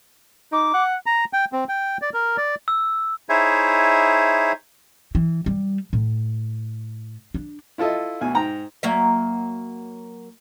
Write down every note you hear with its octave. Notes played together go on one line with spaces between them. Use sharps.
D#4 D6
F#5
A#5
G5
C4
G5
D5
A#4
D5
E6
D#4 E4 G#4 C5 C#5 E5
E3
G3
A2
D4
E4 F4 A4 D#5 E5
D2 B2 G#5
G#2 G5 A#5
F#3 A#3 E5